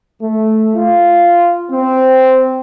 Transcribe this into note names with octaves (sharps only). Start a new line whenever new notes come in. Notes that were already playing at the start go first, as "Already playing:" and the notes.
A3
F4
C4